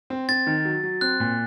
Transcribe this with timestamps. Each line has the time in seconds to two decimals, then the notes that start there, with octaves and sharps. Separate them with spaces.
0.10 C4
0.29 C4 A6
0.47 D#3
0.65 F#3
0.84 F#3
1.01 C4 F#6
1.20 A#2